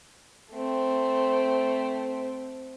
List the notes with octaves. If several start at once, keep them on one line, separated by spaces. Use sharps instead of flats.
A3 C4